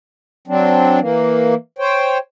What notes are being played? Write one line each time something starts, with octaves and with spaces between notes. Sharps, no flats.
F#3 C4 D4
E3 A#3
C5 C#5 G5